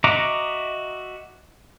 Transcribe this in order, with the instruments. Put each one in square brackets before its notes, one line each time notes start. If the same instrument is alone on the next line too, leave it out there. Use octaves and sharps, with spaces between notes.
[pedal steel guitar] F#4 D#5 E5 A#5 D6